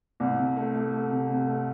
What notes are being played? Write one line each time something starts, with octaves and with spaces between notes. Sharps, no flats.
C2
C3
A3
A3
A3
C3
C3
A3